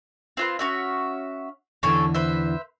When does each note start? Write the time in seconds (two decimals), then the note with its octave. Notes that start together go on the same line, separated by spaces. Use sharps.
0.37 C4 F4 B4
0.59 C#4 F#4 E5
1.83 E2 D3 E3 C#4 A4 G#5
2.14 B4 C5 E5